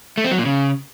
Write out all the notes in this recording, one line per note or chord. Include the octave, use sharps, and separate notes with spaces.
A3
C4
F#3
A#2
C#3